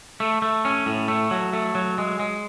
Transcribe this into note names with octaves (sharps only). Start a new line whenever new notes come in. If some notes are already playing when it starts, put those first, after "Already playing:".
A3
A3
C#4
A2
A3
F#3
A3
F#3
G#3
G#3